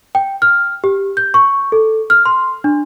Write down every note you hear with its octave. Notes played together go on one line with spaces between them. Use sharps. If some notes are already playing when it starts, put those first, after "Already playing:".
G5
F6
G4
G6
C#6
A4
F6
C6
D4